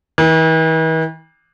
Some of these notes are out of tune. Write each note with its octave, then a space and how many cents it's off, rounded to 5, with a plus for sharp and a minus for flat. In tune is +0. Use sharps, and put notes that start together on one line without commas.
E3 -45